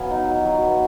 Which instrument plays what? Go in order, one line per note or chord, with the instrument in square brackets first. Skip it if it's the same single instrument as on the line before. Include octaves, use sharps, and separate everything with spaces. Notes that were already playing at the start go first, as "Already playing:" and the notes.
Already playing: [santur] F#3 B3 F5 G#5
D#4
F#3
F#3
B3